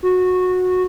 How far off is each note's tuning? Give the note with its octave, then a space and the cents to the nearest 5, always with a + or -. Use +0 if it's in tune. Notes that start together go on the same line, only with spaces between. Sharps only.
F#4 -15